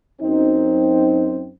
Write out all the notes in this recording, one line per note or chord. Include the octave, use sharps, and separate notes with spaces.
F#2 C4 D#4